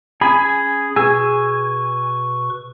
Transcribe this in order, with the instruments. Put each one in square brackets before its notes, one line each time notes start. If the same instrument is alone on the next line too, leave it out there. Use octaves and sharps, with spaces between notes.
[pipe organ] C#4 [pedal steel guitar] G#4 G#5 [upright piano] B5
[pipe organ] B2 B4 C#6 [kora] G#4 [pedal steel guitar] G#5 [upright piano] E6